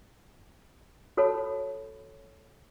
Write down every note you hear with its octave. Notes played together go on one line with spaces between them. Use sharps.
F#4 A4 C#5 A5 B5